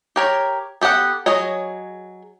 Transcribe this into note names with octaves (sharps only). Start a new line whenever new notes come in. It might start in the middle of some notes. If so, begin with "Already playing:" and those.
G4 A#4 C#5
B3 G4 A4 F#5
F#3 G#4 C#5 D#5